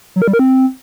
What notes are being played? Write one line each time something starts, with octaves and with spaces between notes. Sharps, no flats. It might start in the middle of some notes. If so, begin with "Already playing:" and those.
F#3
A#4
G3
A#4
C4